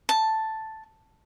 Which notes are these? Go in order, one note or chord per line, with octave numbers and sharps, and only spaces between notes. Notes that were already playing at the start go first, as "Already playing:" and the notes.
A5